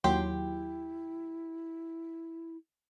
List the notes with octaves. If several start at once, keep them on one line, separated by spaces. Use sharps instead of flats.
D#2 F#3 E4 G4 G5 C6